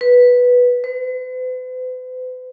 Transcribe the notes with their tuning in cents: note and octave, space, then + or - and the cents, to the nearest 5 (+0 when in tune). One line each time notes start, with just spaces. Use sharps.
B4 -5
B4 +45